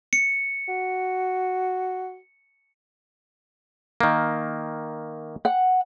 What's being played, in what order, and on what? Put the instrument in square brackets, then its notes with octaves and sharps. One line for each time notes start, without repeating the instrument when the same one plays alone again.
[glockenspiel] C#7
[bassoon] F#4
[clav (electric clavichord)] D#3 A#3
[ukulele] F#5